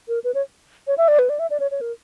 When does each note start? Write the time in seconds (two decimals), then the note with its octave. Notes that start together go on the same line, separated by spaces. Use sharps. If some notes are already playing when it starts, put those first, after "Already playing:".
0.08 A#4
0.24 B4
0.34 C#5
0.87 C#5
0.98 E5
1.08 D5
1.19 B4
1.29 D5
1.39 E5
1.50 D5
1.60 C#5
1.71 C#5
1.81 A#4